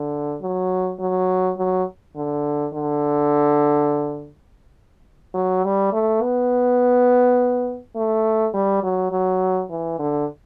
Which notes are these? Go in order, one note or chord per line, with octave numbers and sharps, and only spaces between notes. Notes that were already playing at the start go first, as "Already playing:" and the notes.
Already playing: D3
F#3
F#3
F#3
D3
D3
F#3
G3
A3
B3
A3
G3
F#3
F#3
E3
D3